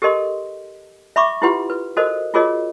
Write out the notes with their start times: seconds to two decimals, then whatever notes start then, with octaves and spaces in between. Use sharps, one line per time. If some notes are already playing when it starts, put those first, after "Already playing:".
0.02 G4 A4 A#4 D#5 C6
1.16 E5 B5 C#6 D6
1.42 E4 F4 G4 B4 F#5 C6
1.70 B4
1.97 F#4 A4 A#4 C5 D#5
2.34 F4 F#4 G#4 A#4 C#5 D#5